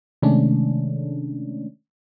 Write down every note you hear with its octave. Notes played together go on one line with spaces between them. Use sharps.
C3 D#3 G#3 A3 C#4 D4